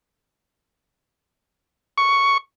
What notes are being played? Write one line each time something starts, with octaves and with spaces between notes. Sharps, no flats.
C#6